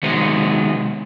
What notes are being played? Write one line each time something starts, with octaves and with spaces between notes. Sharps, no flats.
C3 D#3 F#3 G#3 B3